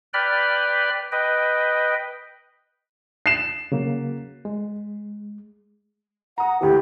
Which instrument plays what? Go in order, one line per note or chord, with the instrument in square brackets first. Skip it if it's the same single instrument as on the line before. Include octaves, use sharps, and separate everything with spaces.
[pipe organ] B4 D5 G5 B5 F6
B4 D#5 G5
[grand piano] C7 E7
[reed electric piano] C#3 F#3 A#3
G#3
[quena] F#5 [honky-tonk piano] A#5 D#6
[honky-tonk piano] D2 E3 [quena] G4